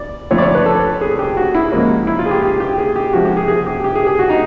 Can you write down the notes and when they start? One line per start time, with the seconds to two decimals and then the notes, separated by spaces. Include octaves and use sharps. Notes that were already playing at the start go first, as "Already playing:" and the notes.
Already playing: D5
0.31 F2 D3 F3 A3 C#5
0.38 D5
0.42 C#5
0.55 B4
0.66 A4
1.01 G#4
1.19 G4
1.37 F#4
1.54 E4
1.72 G#2 F3 A#3 C#4
2.07 E4
2.19 F4
2.26 G#4
2.31 G4
2.42 G4
2.60 G4
2.78 G#4
2.96 G4
3.13 C3 F3 G#3 F#4
3.25 G4
3.37 G#4
3.48 G#4
3.66 G4
3.84 G4
3.95 G#4
4.07 G#4
4.19 F#4
4.30 D#4